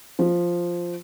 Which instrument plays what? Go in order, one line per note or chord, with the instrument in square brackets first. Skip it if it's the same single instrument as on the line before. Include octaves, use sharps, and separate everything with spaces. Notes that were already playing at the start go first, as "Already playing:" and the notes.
[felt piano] F3